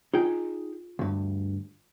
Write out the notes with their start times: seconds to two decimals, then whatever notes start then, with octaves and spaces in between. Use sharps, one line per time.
0.14 D#4 F4 G#4 G5
0.99 D2 G2